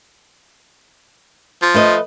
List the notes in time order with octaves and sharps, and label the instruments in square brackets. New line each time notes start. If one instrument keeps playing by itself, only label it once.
[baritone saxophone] F3
[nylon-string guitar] A3 B4 D#5